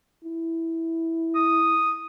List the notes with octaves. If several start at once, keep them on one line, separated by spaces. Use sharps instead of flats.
E4
D#6